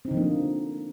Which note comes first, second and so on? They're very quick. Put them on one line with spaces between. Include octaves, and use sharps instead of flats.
C4 D#4 D3 F3 A#3